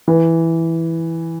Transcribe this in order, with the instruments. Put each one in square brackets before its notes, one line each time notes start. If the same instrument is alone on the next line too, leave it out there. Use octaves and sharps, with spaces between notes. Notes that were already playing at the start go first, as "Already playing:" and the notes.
[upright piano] E3